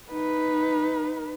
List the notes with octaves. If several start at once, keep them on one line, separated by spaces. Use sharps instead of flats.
D#4 B4